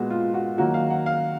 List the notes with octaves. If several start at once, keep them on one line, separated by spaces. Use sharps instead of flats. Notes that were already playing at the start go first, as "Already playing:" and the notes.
Already playing: A#2 G#3 B3 F#4
F4
F#4
D#3 F#3 A#3 F#4
F5
F#5
F5